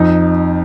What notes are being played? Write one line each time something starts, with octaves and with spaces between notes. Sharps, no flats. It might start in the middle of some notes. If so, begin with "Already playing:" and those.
Already playing: F2 D#4